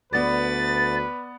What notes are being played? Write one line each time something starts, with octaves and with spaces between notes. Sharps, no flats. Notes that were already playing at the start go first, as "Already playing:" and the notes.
D2 B3 B4 D5 A6